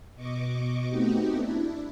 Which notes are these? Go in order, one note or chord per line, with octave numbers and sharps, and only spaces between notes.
B2 D#5 C#6 D6
A3 B3 C4 D#4 F#4 G4
D4 E4